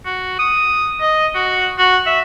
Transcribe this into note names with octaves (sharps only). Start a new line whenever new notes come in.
F#4
D#6
D#5
F#4
F#4
E5